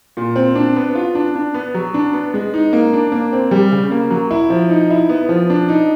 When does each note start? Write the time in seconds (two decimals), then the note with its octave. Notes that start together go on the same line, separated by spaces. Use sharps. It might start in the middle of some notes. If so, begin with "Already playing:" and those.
0.17 A#2
0.36 C4
0.55 D4
0.76 B3
0.95 F4
1.15 D4
1.35 D4
1.54 B3
1.74 F#3
1.94 D4
2.13 B3
2.34 G#3
2.54 D#4
2.73 A#3
2.93 D4
3.12 A#3
3.33 C4
3.51 G3
3.72 C#3
3.91 A#3
4.10 F#3
4.31 E4
4.50 F3
4.70 D#4
4.91 E4
5.09 B3
5.29 F3
5.50 D4
5.69 D#4